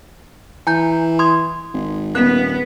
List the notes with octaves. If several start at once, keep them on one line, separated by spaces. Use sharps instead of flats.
E3 G#5 A#5 G6
C6 D#6 G#6
G#1
D#1 B3 F#6